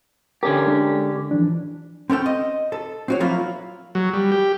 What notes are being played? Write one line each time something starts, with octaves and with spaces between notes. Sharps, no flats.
D3 C#4 G4 A#4
G#3 D4 A4
E3 F3 D4
C4 C#4 A4 G5
D#5
A4
C4 F#4 C#5
F3 F#3 A#3 E4 F4
F#3
G3
G4